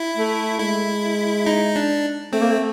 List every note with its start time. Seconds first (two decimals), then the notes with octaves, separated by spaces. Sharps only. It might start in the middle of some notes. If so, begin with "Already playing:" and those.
Already playing: E4
0.17 A3
0.60 G#3 E4
1.46 D#4
1.76 D4
2.33 A3 C4
2.42 A#3
2.51 A3